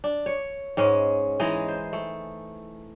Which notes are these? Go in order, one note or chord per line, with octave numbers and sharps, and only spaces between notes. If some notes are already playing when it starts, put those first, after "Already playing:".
D4
C#5
G#2 G#3 C#4 F#5
E3 G#3 D#4 D#5
C5
A3